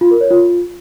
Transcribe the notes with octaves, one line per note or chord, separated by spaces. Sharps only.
F4
A#4
C#5
F4